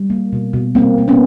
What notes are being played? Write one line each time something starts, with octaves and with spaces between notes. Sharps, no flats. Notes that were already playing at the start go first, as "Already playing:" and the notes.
Already playing: G3
A#3
B2
B2
G3 A#3 C4
A#3
B3 C#4